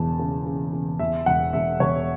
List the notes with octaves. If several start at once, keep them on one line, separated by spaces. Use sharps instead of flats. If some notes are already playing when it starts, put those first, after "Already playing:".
Already playing: E1 E2 C#3 A5
C#3
C#3
C#3
E2 E5
E1 F#5
E1 E5
E1 C#5